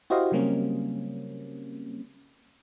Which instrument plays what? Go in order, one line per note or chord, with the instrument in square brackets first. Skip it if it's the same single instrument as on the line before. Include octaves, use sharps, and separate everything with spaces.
[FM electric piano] E4 F#4 G4 C5 D#5 F5
C#3 F#3 G3 A#3 C4 C#4